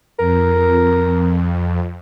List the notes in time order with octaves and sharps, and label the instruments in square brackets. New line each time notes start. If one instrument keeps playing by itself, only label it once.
[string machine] F2 [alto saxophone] A#4